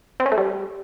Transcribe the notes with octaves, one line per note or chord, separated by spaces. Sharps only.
C4
C#4
A3
G3